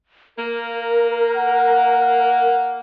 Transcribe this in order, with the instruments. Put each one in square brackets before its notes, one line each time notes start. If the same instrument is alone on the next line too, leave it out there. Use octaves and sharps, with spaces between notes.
[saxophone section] A#3 [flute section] A#4
[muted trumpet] F#5